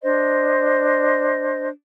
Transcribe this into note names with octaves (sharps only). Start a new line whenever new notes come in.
D4 C5 D#5